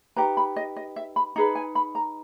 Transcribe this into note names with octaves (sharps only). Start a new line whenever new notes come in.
D#4 G4 B4 A#5
B5
D#5
D#5
E5
B5
D#4 G#4 B4 A#5
G#5
B5
A#5